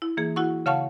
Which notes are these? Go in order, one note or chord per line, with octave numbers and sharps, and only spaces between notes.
E4
E3 A#3 G#4
E4 F#4 F#5 C#6
C#3 C#5 F5 F#5 A5 C#6